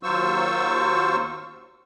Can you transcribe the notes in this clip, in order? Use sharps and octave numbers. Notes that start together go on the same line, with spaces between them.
D#2 F#3 F4 C5 C#6 E6